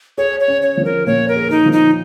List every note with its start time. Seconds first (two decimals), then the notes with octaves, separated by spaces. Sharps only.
0.18 G#4 C#5
0.40 C#5
0.48 C#4
0.62 C#5
0.77 F3
0.85 A#4
1.06 A#2 C#5
1.28 A#4
1.36 G#4
1.50 D#4
1.65 F3
1.72 D#4